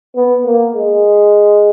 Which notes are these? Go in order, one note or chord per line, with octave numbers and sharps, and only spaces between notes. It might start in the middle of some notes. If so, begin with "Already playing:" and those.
B3
A#3
G#3